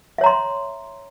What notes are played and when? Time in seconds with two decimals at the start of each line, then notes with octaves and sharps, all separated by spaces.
0.18 E5
0.21 C#5
0.24 A#5
0.26 C6